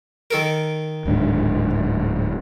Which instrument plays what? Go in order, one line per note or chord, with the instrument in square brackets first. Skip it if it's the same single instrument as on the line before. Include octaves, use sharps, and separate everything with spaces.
[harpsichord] D#3 A4 A#4
[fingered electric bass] D1 G#2 D4